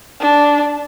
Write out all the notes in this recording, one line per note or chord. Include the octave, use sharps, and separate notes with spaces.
D4